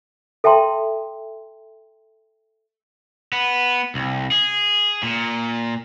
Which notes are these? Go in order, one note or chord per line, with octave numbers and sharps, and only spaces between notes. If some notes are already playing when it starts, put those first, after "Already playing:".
A4 E5 G5 A5 C6
B3
C2
G#4
A#2